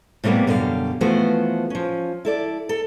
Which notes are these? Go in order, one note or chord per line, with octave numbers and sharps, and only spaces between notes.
A2 C3 G3 A#3 B3
F#2 B2 D3 G3 G4 F5
E3 F3 A3 B3 F#4 C5
F3 C#4
E4 A4 D5
A4